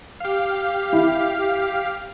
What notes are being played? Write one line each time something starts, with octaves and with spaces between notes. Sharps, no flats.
G4 F5
E4